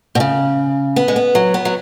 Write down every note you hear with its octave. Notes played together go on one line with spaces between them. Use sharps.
B2
C#3
B3
G#3
B3
F#3
B3
F#3